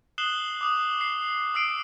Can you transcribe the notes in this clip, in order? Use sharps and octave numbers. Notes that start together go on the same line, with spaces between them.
D#6 F#6 C7 E7 F#7 G7
D6 D#6
C7
D#6 E6 C7 D7